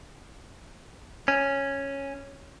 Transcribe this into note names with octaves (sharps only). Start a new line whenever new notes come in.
C#4